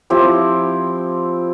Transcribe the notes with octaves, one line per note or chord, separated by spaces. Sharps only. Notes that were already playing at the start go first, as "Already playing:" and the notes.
F3 C4 E4 G4